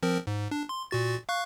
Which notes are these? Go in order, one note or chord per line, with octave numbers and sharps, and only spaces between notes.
F3 C4 A#4
G#2
D4
C6
A#2 F#4 A6
F5 C#6 F#6